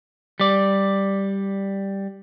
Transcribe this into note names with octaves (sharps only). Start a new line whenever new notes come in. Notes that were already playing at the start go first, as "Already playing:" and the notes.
G3 D5